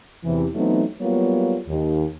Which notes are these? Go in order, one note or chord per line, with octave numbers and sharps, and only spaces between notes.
E2 C3 E3
E3 F#3 A3 B3 C4 D#4
F#3 G3 A#3 B3 F4 C#5
D#2